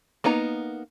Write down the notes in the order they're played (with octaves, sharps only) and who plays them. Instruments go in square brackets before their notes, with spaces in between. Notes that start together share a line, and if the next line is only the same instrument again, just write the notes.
[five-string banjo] A#3 B3 D#4 A#5